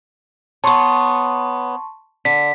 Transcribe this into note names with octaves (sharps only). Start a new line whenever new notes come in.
B3 C#5 A5 C6 C#6
D3 B6